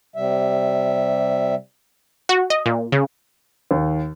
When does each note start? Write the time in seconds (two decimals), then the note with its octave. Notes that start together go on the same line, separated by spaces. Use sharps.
0.16 C3 G3 E5
2.29 F#4
2.50 D#5
2.66 A#2
2.92 C#3
3.71 D#2